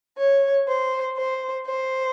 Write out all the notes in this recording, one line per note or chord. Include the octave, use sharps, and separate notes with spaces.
C#5
C5
C5
C5